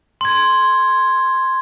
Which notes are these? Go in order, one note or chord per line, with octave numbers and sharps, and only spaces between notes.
C6 G#6